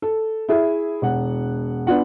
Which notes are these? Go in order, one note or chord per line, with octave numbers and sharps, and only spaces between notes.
A4
E4 G#4 E5
E1 F#5
B3 D4 F4 F#5